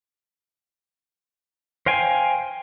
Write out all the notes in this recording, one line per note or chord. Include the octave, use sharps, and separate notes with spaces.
C5 F5 G5 G#5